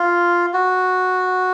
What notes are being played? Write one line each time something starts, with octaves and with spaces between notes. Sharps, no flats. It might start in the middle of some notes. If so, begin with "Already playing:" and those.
Already playing: F4
F#4